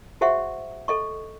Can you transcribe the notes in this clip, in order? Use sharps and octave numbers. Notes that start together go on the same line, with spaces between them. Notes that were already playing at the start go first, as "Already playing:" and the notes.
F#4 G#4 C5 E5 F#5 C#6
A4 D#5 C#6